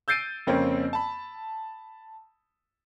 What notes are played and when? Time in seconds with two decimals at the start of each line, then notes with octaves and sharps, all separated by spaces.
0.08 E6 G6 A6 C7 D7 D#7
0.47 F2 C#3 A#3 C4 C#4
0.93 A5 B5